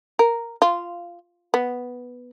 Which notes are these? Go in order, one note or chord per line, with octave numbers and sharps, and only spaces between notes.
A#4
F4
B3